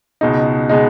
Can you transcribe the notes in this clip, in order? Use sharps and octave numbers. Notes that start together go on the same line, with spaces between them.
C#2 B2 G#3 D#4
B2 G#3 D#4